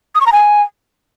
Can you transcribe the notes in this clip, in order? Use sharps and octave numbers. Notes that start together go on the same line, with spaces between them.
D#6
C#6
A#5
G#5